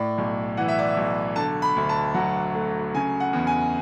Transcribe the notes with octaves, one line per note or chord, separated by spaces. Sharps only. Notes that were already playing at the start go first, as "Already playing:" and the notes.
Already playing: A2 D5
B1
E3 F#5
E5
D5
E5
B1
D3 A5
B5
D2
A5
F#3 F#5
A3
C#3 G#5
F#5
E2
G#5